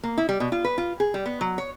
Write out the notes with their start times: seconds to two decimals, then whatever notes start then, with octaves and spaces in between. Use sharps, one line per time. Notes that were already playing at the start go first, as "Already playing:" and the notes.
0.03 A#3
0.18 E4
0.29 G3
0.40 B2
0.52 F4
0.64 B4
0.78 F4
1.00 G#4
1.14 G3
1.26 B3
1.41 F#3
1.58 C#5